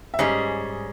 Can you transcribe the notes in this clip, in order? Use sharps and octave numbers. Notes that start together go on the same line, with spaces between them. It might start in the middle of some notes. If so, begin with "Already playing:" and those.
E5
G#2 G3 C#4 G#4 D#5